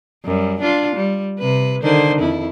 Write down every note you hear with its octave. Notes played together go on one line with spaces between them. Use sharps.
F#2 G3
D4 F4
G3
C3 B4
D3 D#3 C5
F2 E4